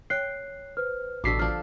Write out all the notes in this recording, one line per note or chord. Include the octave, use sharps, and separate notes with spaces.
C#5 G5 F#6 C7
B4 C5 F6
A1 B2 D3 A4 D6 B6 C7
F3 D4 F6